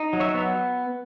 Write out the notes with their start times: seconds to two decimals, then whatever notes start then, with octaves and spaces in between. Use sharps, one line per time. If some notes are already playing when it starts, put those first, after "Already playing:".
Already playing: D#4
0.13 F#3
0.20 C#5 E5
0.34 B3